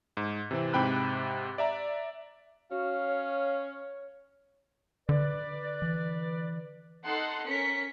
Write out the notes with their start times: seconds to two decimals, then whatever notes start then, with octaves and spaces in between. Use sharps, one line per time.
0.17 G#2
0.51 C3 E3 C4
0.73 G#2 C3 G5 B5 F#6
1.58 D5 E5 A#5
2.71 C#4 F#4 F5
3.07 C#5
5.09 D3 B4 D5
5.82 E3
7.04 D#4 A4 F#5 C6
7.47 C#4 A#4 B6 C#7